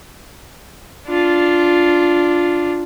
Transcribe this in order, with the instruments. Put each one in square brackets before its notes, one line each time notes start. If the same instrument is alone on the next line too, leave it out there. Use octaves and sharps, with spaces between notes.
[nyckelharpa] D4 F4